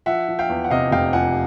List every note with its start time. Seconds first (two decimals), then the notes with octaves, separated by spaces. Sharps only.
0.06 F3 E5 F#5
0.28 F3
0.39 F5 G5
0.49 E2
0.64 F#5
0.71 C3 D#5 F5
0.92 F1 F5 G5
1.13 F3 F#5 G#5